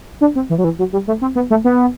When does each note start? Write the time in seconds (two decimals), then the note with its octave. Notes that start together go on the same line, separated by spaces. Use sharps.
0.21 D4
0.36 C4
0.50 E3
0.58 F#3
0.64 E3
0.79 F#3
0.93 G3
1.07 A3
1.21 C4
1.35 B3
1.50 A3
1.64 B3